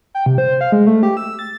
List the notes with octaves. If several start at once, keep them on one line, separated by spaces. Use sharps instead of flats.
G5
C3
C5
F5
G#3
A3
G4
E6
A6